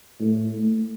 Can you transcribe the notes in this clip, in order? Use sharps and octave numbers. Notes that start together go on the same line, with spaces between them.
A2
A3